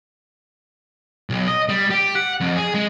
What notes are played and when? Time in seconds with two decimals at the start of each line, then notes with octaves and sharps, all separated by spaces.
1.30 B1
1.47 D#5
1.69 G3
1.91 G4
2.15 F#5
2.40 F2
2.56 G#4
2.74 G#3